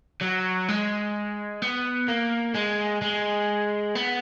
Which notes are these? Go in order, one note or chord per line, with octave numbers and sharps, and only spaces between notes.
F#3
G#3
B3
A#3
G#3
G#3
B3